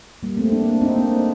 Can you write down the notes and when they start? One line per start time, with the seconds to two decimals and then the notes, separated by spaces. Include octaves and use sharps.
0.23 G3 A#3
0.37 A3 C4
0.52 A#3 D4
0.81 C4 D#4
0.96 A#3 D4